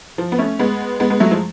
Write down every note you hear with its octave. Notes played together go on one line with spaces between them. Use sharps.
F3
B3
A3 C#4
G#3 B3
G#3 B3
G#3 B3
F#3 A3
F3 G#3